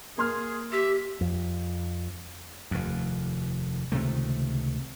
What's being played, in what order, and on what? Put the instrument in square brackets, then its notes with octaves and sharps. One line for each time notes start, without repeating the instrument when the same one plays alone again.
[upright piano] A#3 C6 F6 [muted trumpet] G#4
[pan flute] G4 [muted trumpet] E5
[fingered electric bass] F2
[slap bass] F1 D#2
C#2 C3 D#3 A3